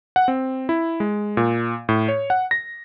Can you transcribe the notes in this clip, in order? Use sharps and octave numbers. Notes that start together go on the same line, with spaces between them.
F#5
C4
E4
G#3
A#2
A2
C#5
F#5
A#6